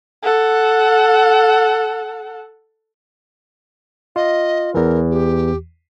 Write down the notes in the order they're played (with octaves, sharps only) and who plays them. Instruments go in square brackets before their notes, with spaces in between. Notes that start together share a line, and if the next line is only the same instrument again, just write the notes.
[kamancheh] A4 F#5
[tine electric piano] F4 [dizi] D#5
[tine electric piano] E2 E3 [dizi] A#4
[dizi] G4